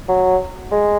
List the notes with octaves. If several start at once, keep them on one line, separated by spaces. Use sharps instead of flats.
F#3
G#3